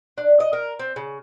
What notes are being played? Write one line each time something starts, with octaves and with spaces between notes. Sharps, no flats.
D4
D#5
A#4
C4
C#3